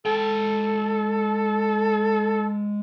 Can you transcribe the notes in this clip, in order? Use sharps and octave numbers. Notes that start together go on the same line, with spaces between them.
G#3 A4 G5